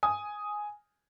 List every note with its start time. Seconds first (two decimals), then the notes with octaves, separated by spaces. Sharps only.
0.03 G#5 D#6